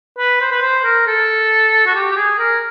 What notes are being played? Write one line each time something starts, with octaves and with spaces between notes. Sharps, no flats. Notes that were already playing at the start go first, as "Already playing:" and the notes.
B4
C5
B4
C5
A#4
A4
F#4
G4
G4
G#4
A#4